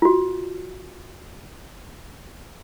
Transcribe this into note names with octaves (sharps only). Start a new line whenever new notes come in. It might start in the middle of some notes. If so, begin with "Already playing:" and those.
F4 F#4